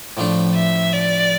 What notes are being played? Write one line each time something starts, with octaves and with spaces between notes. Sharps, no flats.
A2 F3 A3 D4
E5
D5